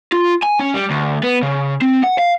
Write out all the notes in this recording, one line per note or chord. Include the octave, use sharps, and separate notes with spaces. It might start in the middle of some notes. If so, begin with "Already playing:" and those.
F4
G#5
C#4
G3
D2
B3
C#3
C4
F#5
F5